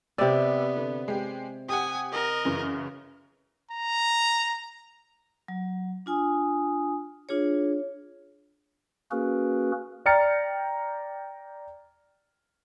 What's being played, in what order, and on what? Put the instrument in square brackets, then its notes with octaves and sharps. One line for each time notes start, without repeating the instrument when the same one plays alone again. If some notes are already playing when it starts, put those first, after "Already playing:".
[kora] C3 D5 [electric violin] B3 [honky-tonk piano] G4 E6
[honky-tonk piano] D3
G#3 G4
[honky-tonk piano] G4 F#5 [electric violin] G#5 D#6
[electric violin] A#4 D#5
[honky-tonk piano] F#2 C#3 E3
[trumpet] A#5
[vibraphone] F#3
D4 F4 G#5 D#6
D4 F4 G#4 C#5
[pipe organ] A#3 C#4 F#4 G#4 A#4 B4
[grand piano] D5 G5 A#5 F6 A6 C#7